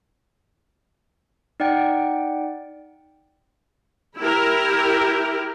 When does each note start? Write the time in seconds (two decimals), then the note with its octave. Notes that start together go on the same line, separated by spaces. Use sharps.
1.60 D#4 D5 F#5 G5
4.19 E4 G4 A#4